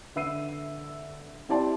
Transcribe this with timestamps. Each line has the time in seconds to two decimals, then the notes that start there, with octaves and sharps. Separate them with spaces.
0.16 D3 B4 E5 E6 C7 D#7
1.49 C4 E4 G4 D5 A5 C6